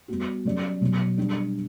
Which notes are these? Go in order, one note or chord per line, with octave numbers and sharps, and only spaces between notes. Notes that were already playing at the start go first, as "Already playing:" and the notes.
G3 B3 F#4
F#3 C#4 G4 D5
B2 F#3 B3
G3 D4 G4